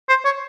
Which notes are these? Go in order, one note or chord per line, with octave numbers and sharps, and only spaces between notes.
C5
C#5